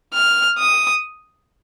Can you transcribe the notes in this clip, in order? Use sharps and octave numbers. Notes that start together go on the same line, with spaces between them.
F6
D#6